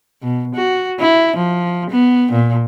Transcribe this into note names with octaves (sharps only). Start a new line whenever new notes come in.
B2
F#4
E4
F3
B3
A#2